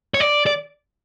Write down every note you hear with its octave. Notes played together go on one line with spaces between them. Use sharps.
C#5
D5
D5